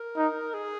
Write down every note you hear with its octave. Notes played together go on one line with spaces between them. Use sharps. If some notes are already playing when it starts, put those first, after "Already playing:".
Already playing: A#4
D#4
G#4